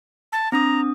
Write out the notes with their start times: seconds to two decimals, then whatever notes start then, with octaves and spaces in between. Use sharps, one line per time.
0.32 A5
0.52 C4 D4 A#5 D#6